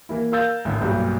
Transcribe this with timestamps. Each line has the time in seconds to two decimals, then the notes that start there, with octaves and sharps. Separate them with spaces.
0.09 E3 A#3 E4
0.32 A#4 F5 E6 G6 A6
0.65 A1 D3
0.81 B1 G2 A#2 F#3 G3